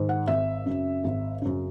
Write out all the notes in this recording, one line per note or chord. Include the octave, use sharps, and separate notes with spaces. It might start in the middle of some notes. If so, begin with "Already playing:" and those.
Already playing: G#2 D#3
F#5
G#1 E5
F#2 C#3
G#1
F#2 C#3